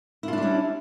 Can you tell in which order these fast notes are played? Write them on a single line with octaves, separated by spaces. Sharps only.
E4 F4 D4 G3 C#4